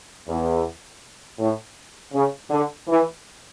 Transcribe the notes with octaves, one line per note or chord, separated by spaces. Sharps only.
E2
A2
C#3
D3
E3